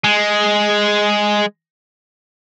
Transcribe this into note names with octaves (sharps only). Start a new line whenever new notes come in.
G#3